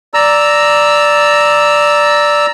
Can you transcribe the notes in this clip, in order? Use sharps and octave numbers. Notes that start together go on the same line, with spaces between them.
D5 A#5 E6